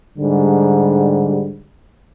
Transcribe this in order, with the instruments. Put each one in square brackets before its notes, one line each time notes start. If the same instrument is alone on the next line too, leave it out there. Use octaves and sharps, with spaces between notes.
[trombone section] G#2 D3 G3